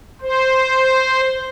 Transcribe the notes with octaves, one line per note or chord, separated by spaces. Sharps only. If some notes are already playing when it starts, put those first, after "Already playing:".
C5